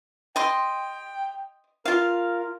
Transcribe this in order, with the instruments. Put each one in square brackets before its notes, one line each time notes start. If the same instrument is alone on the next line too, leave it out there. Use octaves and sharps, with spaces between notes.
[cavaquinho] D#5 C6 [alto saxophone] G5
[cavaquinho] F4 F5 [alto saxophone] A#4